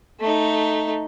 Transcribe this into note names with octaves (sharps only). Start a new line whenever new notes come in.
A3 D#4